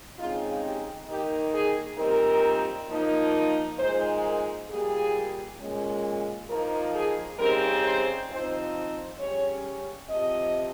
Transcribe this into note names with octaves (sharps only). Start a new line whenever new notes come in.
C#3 G#3 C4 D#4 F4
G4
D#3 A#3 D#4 G4
G#4
A#2 G3 C4 D#4 A#4
F3 A#3 D#4
A#2 G#3 D#4 C5
A#4
A#2 G3 A#3 G#4
A#2 G#3 C#4
F3 A#3 D#4 A#4
G#4
C#3 G3 C4 D#4 A#4
C5
F3 C4 D#4 C5
C#3 G3 C#4 C#5
C3 F3 C4 D#5